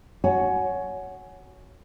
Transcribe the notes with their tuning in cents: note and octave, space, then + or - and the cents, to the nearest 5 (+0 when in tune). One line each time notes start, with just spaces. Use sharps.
F#4 +0 C#5 +15 G#5 +20